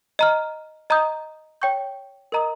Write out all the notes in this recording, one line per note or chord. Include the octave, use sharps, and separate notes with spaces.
D#5 A#5 F6
D#5 A#5 D#6 G6
C#5 G5 C#6 G6
A#4 D#5 A#5 D#6